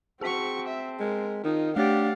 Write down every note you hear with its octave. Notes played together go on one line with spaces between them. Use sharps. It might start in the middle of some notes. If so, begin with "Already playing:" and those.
C4 F#4 G#4 A5 C#6 B6
E5
G#3 A#4
D#3 D#4 F4
A3 D4 G4 C#5 F5 F#5 A6